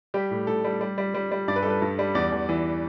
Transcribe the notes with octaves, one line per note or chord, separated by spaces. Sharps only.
G3 G4
A2
A2 A4
G3
G3
G3
G3
G3
G2 D5
B4
G3 A4
B4
G2
G3
E2 D5
E2
E3